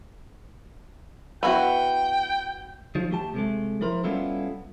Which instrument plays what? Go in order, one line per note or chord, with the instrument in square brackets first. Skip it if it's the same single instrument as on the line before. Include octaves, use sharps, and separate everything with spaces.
[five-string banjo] B3 E4 F#4 [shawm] G5
[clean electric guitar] D#3 F3
A3 G4 A5
C3 G#3 A3
F3 E4 A#4 C5
G3 B3 C#4 E4 F4 A4